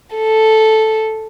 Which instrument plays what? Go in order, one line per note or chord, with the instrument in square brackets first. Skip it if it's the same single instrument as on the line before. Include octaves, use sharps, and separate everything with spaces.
[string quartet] A4